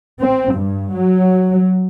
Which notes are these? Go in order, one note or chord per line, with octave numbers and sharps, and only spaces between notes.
C4
G2
F#3